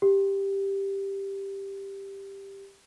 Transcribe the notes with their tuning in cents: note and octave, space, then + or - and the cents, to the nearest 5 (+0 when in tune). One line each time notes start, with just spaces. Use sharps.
G4 +5